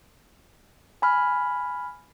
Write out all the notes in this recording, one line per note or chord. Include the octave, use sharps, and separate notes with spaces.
G#5 B5 F6